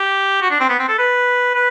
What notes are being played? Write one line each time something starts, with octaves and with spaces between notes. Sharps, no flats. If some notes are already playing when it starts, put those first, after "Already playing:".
Already playing: G4
F#4
D4
C4
B3
C4
A4
B4
B4